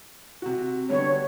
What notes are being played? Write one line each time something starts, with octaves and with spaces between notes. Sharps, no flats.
C3 F#4
D3 G3 B3 C#5